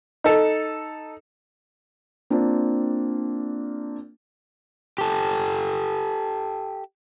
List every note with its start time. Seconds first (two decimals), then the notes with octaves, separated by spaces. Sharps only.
0.24 D#4 A4
2.30 A#3 C4 D4 F4
4.98 G4 A4